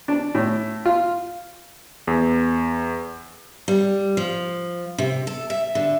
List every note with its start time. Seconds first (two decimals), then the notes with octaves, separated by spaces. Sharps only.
0.08 D4
0.35 A2
0.85 F4
2.07 E2
3.68 G3
4.17 F3
4.98 C3
5.27 A4
5.50 E5
5.75 D3